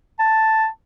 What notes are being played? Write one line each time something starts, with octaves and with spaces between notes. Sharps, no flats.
A5